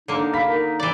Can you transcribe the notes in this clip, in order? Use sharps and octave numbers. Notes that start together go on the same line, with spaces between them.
D3 A#3 D#4
F5 B5 B6
D#4 A#4
E3 D5